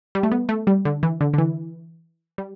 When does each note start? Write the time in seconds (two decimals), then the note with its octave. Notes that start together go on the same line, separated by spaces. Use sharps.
0.15 G3
0.23 A3
0.32 B3
0.49 A3
0.67 G3
0.85 D3
1.03 E3
1.21 D3
1.34 D3
1.38 E3
2.38 G3